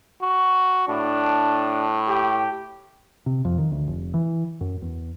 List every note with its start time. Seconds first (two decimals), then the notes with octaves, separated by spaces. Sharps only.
0.22 F#4
0.89 A2 D4
2.08 G4
3.26 C3
3.45 F2
3.58 D#3
3.72 D2
3.88 F1
4.14 E3
4.61 F#2
4.82 E2